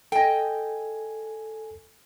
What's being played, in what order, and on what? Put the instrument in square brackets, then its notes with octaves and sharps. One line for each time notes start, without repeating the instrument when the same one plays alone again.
[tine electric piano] A4 G#5 [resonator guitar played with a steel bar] D#5 G5